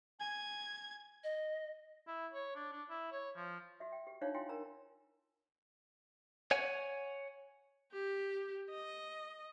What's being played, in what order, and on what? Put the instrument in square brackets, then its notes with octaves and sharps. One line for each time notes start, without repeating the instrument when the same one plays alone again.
[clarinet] G#5 [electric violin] G#6
[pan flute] D#5
[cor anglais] E4
C#5
D4
D4
E4
C#5
F3
[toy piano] F#4 E5
G5
G4
D4 D#4 F4 C#5 F5
E4 F4 G5 G#5 C6
E4 A#4 A#5
[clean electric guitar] C#5 F#5 G#5
[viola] G4
D#5